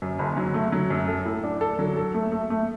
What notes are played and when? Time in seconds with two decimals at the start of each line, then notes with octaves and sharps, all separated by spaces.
0.02 F#2
0.19 F#1
0.37 F#3
0.54 A3
0.72 F#3
0.90 F#2
1.08 A4
1.25 A2
1.44 D4
1.61 A4
1.79 F#3
1.97 A4
2.14 A3
2.32 A3
2.50 A3